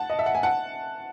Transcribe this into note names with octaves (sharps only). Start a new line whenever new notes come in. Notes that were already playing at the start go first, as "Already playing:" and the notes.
Already playing: F#5 A5
D#5
E5
F#5
G#5
F#5 A5